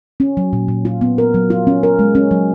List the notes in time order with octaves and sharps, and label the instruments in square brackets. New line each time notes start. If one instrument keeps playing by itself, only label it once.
[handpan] C#4
F#3
A#2
A#2
F4
B3
A#4
F#3
F4
C#4
A#4
G#3
C#4
F#3